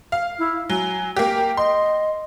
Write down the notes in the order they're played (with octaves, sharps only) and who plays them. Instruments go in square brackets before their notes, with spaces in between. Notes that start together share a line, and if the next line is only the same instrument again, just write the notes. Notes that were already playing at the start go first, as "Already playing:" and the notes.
[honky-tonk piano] F5
[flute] E4
[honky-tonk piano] F#3 [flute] G#5
[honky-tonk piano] A#3 G4 [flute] G5
[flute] D#5 [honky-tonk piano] C6